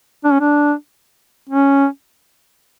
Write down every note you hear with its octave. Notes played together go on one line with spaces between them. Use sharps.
D4
C#4
D4
C#4